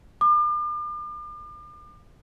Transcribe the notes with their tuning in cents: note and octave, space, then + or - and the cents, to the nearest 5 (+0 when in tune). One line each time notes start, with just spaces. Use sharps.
D6 +40